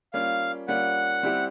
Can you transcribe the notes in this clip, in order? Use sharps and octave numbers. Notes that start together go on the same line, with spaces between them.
G3 A#3 C#4 F4 F5
G3 A#3 C#4 F4 F#5
G3 C4 E4 G4